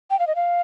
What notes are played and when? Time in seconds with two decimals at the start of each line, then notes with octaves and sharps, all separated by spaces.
0.10 G5
0.19 F5
0.27 D#5
0.36 F5